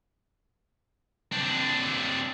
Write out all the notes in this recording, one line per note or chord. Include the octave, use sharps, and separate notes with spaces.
C4 D4